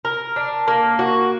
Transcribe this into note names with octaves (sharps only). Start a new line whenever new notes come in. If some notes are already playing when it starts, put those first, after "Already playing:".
A#4
D4
A#3
F#4